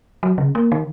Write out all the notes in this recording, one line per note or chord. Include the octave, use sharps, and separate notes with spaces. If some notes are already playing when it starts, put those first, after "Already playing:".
F#3
C#3
A#3
D#3